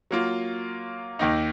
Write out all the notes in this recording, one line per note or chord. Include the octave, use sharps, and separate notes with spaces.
F#3 A#3 F4
D#2 D#3 A#3 D#4